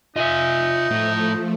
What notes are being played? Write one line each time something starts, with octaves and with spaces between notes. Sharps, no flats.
D#4 F4 D#5 E5 G#5
A2 F3 A3